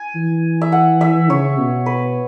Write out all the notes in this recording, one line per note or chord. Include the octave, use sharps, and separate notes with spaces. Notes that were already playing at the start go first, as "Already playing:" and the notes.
Already playing: G#5
E3
E5
F#5
E5
C#3 C#5
B2
B4